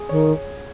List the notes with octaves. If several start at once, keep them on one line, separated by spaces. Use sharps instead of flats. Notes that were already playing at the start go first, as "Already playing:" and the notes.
Already playing: G#4
D#3 C#5